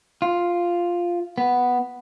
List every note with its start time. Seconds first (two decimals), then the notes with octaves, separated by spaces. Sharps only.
0.22 F4
1.38 B3